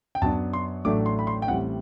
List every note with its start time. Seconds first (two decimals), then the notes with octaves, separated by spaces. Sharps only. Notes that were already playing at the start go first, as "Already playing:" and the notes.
0.15 G5
0.22 F#2 F#3 B3 D4 A5
0.53 C6
0.85 A1 A2 F#3 A3 D4 D6
1.06 C6
1.19 B5
1.27 C6
1.42 G5
1.48 A1 A2 G3 C4 F#5